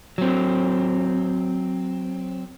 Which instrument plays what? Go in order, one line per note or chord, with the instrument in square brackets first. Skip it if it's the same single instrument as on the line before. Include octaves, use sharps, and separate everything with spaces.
[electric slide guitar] F#3 C4